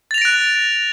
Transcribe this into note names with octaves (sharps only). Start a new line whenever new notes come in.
F#6 A6 A#6 D7 F7